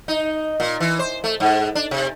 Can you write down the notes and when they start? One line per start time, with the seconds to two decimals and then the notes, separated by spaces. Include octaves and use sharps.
0.08 D#4
0.60 A#2
0.80 E3
0.99 C5
1.24 A3
1.40 G#2
1.75 D4
1.91 C3